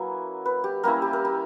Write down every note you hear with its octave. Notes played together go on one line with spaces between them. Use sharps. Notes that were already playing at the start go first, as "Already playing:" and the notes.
Already playing: F#3 A#3 C#4 E4 B4
B4
G4
G3 A#3 C#4 E4 A#4
G4
A#4
G4